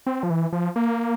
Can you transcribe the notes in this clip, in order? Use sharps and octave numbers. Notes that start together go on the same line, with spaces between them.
C4
F3
E3
F3
A#3